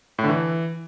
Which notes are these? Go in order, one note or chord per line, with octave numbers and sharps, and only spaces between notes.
A2
D3
E3